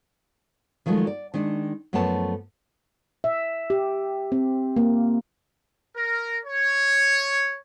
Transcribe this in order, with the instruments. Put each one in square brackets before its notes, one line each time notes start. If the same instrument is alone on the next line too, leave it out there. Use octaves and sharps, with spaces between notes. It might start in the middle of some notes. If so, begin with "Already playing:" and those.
[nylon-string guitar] D#3 F3 F#3 G#3 A3
D5
D#3 G#3 D4
F#2 F3 A3 B3 C#5 A5
[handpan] E5
G4
C4
A#3
[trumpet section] A#4
C#5